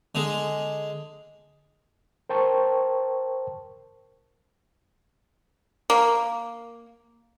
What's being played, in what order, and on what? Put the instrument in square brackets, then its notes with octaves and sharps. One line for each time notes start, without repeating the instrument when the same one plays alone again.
[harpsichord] D3 G#3
[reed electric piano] A#4 C5 G5 A5 C#6
[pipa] A#3